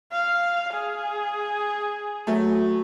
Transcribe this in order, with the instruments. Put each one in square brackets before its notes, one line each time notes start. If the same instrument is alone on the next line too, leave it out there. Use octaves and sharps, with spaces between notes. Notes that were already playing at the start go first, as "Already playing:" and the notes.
[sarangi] F5
G#4
[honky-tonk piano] F#3 A3